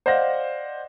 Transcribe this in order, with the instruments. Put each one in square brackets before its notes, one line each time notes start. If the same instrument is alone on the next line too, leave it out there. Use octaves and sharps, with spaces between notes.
[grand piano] C5 D5 D#5 F5 F#5 A#6